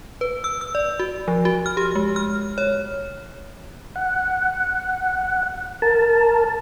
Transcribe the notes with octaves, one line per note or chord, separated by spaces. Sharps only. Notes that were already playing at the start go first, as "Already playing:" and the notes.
B4
E6
E6
D5
F#4
F3
F#4
F6
G4
G#3
F6
C#5
F#5
A#4 A5